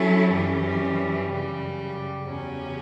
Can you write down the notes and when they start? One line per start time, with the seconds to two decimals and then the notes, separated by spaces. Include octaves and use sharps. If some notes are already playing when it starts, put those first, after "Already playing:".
Already playing: F#3 C#4 E4 A4
0.31 F#2 E3 G3 C#4
1.29 F#2 C#3 G3
2.27 E2 C#3 F#3 C#4 G4